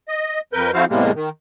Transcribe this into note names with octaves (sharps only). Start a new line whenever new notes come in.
D#5
F2 A#4 B4 G6
F2 F3 E4 F#4 C5 F5
E2 A2 C3 G3 G#3 A#3
D#3